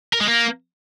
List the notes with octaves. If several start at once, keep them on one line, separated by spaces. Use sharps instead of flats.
A#4
G#3
A#3